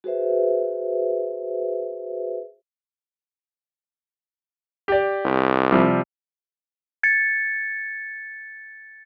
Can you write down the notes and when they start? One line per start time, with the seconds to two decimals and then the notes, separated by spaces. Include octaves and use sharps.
0.04 F#4 G#4 B4 C5 E5
4.88 G4 D5
5.25 C2
5.71 C3 F3 G3
7.03 G#6 A6 C#7